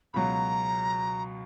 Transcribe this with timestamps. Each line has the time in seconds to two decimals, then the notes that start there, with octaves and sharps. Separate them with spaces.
0.14 C#2 B2 F#3 A#5 B5